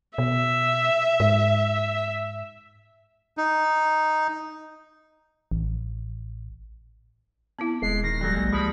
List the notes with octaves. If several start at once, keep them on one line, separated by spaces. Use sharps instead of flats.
B2 E5
G#2
D#4
A1
B3 C4 E4
D#1 G#3 C7
D#3 A#6
G#2 F#3 G3 A4
A#1 A#3
C#2 F3 G3 G#3 B5